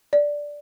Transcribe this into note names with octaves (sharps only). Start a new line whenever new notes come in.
D5